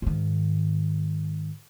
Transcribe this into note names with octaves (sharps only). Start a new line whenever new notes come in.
G#2 D#3